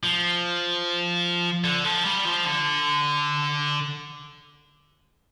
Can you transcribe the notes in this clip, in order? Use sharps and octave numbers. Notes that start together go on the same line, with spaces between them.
F3
D3
F3
G3
F3
D3